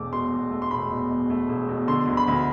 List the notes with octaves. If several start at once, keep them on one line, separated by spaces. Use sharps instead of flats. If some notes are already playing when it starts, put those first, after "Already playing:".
Already playing: E1 E2 A3 D6
B2 C6
E2
A3
C6
E1 B5
B2
E2
A3
E1
B2
D3 C6
D2
B5
D2